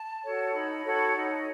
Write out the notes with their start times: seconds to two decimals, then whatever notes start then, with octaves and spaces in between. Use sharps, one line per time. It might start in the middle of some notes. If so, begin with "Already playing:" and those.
Already playing: A5
0.23 F#4 A4 C#5
0.53 D#4 B5
0.84 F#4 A4 C#5
1.15 D#4